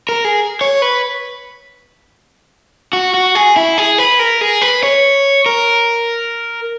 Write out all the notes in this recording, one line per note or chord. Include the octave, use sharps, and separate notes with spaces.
A#4
G#4
C#5
B4
F#4
F#4
G#4
E4
G#4
B4
A#4
G#4
B4
C#5
A#4